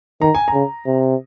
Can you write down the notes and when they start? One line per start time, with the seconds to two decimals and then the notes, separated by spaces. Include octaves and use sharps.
0.21 D#3 A#5
0.35 G#5
0.48 A#5
0.54 C#3
0.86 C3